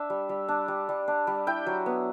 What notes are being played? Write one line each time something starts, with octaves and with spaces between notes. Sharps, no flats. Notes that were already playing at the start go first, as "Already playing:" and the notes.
Already playing: D4 E5
G3
G3
D4
G3
G3
D4
G3
E4 G5
F#3
B3